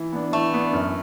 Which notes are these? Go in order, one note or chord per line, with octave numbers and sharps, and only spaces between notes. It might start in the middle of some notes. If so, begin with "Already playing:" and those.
Already playing: E3
B3 D4
E3 A3
B3 D4
F#2